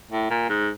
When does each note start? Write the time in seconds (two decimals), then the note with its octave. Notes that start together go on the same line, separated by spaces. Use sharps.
0.11 A2
0.30 A#2
0.49 G#2